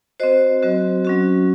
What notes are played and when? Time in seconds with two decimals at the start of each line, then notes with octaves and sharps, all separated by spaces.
0.20 F#4 C5 D#5
0.23 C4
0.63 F#3 C4 F#4
1.05 F#3 C#4 F#4